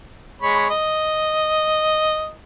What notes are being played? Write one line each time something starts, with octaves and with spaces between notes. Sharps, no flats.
G#3 C#5 B5
D#5